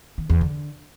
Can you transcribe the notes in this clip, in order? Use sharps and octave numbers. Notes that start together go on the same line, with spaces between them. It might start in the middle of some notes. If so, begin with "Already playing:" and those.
D#3
E2
D3